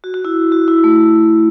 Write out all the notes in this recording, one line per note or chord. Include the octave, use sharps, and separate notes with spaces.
F#4
F#4
E4
F#4
E4
A3